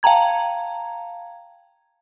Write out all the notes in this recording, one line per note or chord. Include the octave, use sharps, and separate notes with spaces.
F5 G5 A5 A#5 G#6